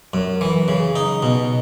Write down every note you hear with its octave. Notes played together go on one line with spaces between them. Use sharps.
F#2
E3
C#3
D#4
B2